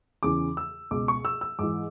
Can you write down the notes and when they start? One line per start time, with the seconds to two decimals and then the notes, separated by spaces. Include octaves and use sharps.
0.23 E2 C#3 E3 D6
0.57 E6
0.91 C#2 B2 D6
1.08 C#6
1.25 E6
1.41 E6
1.59 G#2 E3 D6